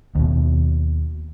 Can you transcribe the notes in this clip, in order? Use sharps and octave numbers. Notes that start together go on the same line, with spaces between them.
D#2 B2